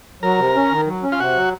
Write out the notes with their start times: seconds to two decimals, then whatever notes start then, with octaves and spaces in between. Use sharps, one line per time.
0.23 F#3 A#4
0.38 C3
0.55 C#4
0.71 D#3
0.87 F#3
1.03 C#4
1.12 F4
1.20 C3 F#4
1.36 F#3